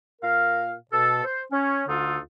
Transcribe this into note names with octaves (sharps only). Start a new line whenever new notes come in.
A#2 A#4 F5
B2 A4
C5
C#4
D2 D3 D#4 F4 A4